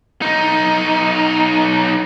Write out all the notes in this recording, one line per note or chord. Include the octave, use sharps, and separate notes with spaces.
B1 D#4